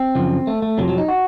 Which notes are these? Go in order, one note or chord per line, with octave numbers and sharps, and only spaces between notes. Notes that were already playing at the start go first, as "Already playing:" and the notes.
Already playing: C4
F#2 C#3 F3
A3
A3
F2 C3 F3 F#3
F#3
D#4
F#4